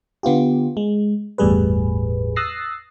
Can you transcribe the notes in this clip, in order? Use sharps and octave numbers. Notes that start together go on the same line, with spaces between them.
D3 B3 F4 G4
G#3
G1 E2 A2 G3 G#4 B4
D#6 E6 F#6 A6 A#6 C7